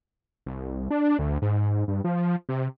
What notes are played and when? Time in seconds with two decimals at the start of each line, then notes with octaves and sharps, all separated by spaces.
0.46 C2
0.91 D4
1.19 D2
1.42 G#2
1.88 G2
2.04 F3
2.49 C3